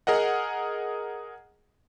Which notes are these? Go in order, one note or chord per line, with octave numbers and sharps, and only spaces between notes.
G#4 A#4 D#5 F#5